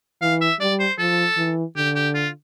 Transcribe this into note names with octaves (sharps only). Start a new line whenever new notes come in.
E3 F5
E5
G3 D5
C5
F3 A4
E3
D3 G4
G4
F4